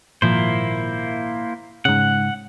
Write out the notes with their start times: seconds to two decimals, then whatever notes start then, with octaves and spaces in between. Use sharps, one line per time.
0.22 G#1 A#2 F3 A#3 E4 C5
1.85 G#2 C#3 F#5